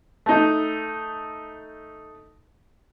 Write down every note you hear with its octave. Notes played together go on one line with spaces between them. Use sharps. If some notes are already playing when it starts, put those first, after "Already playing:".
A3 D#4